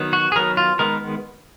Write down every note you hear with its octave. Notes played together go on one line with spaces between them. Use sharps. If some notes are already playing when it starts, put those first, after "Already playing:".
Already playing: D#3 F#3 B3
F#4
G#4
D#3 F#3 B3 A#4
F4
D#3 G#3 B3 A#4